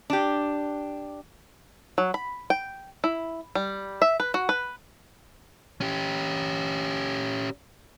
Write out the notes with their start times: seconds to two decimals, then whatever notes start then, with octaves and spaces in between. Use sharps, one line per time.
0.10 D4 G4
1.98 F#3
2.14 B5
2.50 G5
3.04 E4
3.55 G3
4.02 E5
4.20 B4
4.34 F#4
4.49 B4
5.81 C#4 G4